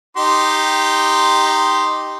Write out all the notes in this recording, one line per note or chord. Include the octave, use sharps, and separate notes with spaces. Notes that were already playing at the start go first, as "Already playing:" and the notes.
D#4 G4 C6